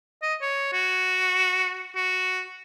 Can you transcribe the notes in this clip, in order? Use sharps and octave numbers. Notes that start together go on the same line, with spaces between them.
D#5
C#5
F#4
F#4